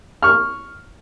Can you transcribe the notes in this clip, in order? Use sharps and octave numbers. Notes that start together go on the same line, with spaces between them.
C#6 F6